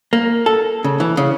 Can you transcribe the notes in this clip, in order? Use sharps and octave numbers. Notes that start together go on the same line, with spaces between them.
A#3
A4
C#3
E3
C#3